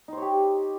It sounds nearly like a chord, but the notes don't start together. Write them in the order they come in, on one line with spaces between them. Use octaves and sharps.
D#4 C5 C#5 G4